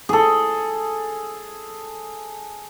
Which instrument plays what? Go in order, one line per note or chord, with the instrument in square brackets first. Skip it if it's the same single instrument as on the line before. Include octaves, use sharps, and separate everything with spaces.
[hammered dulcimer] G#4 A4